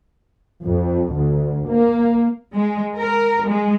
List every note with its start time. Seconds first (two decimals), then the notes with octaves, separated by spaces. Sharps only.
0.64 F2
1.15 D2
1.68 A#3
2.55 G#3
2.96 A#4
3.45 G#3